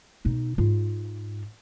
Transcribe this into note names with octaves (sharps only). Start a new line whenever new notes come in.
B2 D#4
G#2 F4